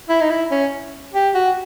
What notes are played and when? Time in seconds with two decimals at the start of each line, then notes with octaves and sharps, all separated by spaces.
0.09 E4
0.21 D#4
0.30 E4
0.51 C#4
1.14 G4
1.35 F#4